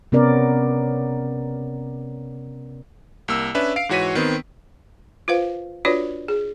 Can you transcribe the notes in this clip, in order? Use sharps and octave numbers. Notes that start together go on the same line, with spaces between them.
C3 B3 C#4 A#4 D5
C2 A#3 E6
C#4 D4 B4 E5
F5 C7 D7
G#2 E3 F#4 C#5 B6 D#7
D#3 B3 C4
F4 B4 C5 F5
D4 F4 F#4 B4 C#5 D5
G#4